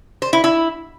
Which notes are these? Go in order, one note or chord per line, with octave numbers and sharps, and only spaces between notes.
C5
E4
E4